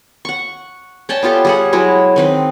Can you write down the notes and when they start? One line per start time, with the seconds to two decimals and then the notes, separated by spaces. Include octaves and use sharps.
0.25 F#5 C#6
1.09 C#4 D5 G5 A5
1.23 B3 F4 G4 A4
1.45 G3 G#4 F#5
1.73 F#3 G#3 E4
2.16 D#3 C4 B4